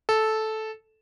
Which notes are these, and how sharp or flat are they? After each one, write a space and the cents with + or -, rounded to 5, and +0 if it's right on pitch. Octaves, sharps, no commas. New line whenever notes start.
A4 -10